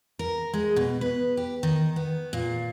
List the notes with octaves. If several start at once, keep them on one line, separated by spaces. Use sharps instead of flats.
A#4
G#3
B2
B4
G4
D#3
B3
A#2